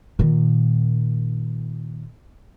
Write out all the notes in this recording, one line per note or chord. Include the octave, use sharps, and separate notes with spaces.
A#2 D#3